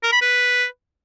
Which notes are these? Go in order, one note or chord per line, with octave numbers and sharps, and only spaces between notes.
A#4
B5
B4